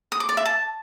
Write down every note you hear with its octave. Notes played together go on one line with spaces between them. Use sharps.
D#6
D6
D5
E5
A5